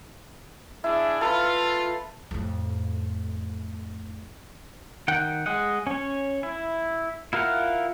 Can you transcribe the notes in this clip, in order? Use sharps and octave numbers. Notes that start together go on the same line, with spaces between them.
D4 E4 G#4
F4 A4 B4 B5
F2 A2
D#3 F#5 G5
G#3 D#5 F#5
C#4 C#5
E4
E4 F4 A#4 F5 F#5